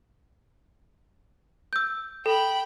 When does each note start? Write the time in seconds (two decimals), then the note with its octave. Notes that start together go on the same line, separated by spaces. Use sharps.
1.73 E6 G6
2.26 A4 G5 B5